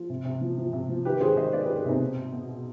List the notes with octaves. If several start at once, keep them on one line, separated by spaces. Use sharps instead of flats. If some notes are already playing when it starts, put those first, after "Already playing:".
Already playing: F3 F4
C3
C3
F3
F3
C3
F3
D#3 G4 B4
D#3 G#4 C5
D#3 C5 D#5
D#3 B4 D5
G4 B4
D#3
G4 B4
C3 C4 D#4
B2
B2
B2
B2